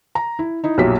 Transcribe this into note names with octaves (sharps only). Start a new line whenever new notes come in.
A#5
E4
D#4 E4
B1 F#2 A#2 F#3 G4 B6